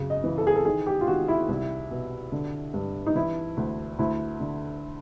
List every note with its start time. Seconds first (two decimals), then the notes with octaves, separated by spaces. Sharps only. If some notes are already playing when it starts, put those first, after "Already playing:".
Already playing: F#2 C#3
0.10 D#5
0.24 E3
0.38 A4
0.47 G#4
0.56 A4
0.65 D#3 G#4
0.87 G4
1.01 F4
1.07 D#3 F#4
1.28 E4
1.49 C2
1.91 B2
2.32 D3
2.74 G2
3.07 D#4
3.15 E3 E4
3.57 D2
3.99 D2 E4
4.40 D3